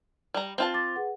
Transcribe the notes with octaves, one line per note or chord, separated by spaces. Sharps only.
G3 A#5
C4 F4 A5
C6 D6 A6
G#4 B4 F#5